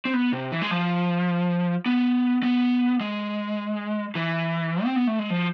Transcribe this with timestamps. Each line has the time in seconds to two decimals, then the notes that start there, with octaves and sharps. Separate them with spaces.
0.05 C4
0.13 B3
0.33 C3
0.52 E3
0.62 G#3
0.71 F3
1.86 B3
2.43 B3
3.01 G#3
4.15 E3
4.85 C4
4.96 B3
5.07 A3
5.19 G#3
5.30 F3